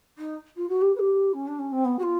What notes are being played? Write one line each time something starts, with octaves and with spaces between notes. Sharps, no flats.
D#4
F4
F#4
G4
B4
G4
C#4
D4
C#4
C4
B3
F#4
F4